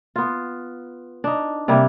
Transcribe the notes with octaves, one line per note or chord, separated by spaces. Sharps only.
B3 F4
D4 D#4
C3 G3 A#3 E4